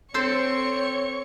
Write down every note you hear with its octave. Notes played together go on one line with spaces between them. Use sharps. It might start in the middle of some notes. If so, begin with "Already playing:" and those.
C4 A4 C5 C#5 C#6